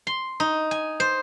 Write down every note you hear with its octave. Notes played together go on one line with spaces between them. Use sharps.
C6
D#4
G#5
C5